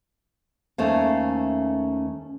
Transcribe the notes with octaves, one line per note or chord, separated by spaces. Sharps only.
D#2 A3 C#4 C5 F5